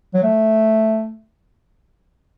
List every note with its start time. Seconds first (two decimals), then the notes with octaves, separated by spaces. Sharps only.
0.14 F#3
0.23 A3